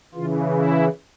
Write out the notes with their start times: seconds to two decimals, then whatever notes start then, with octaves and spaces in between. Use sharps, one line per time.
0.14 C#3 E3 F4
0.52 E4